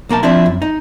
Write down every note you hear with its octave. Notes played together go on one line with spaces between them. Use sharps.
B1 A#3 A#4 A5
F3 C4 D4 E4
F#2
D#4